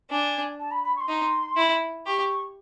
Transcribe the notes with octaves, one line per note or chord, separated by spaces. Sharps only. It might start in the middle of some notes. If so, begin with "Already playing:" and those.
D4 G#5
A5
B5
B5
C#6
C6
D#4
E4
G4 C#6